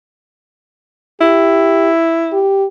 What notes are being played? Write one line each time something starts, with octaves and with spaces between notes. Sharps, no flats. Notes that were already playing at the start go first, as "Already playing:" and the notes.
E4 G4
G4